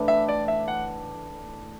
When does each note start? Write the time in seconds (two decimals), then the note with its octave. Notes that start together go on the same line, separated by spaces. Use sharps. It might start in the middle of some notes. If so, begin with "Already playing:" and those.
Already playing: A2 E3 D4
0.08 E5
0.29 D5
0.48 E5
0.68 F#5